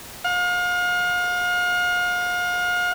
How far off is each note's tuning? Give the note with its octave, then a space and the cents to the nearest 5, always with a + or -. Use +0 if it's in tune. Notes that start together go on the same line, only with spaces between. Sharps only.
F5 +35